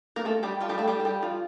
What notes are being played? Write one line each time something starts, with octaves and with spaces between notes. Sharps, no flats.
A#3 A#4
A3 A4
G3 G4
F3 F4
G3 G4
A3 A4
G3 G4
A4
G3 G4
F3 F4